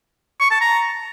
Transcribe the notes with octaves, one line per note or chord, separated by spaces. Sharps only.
C#6
A5
A#5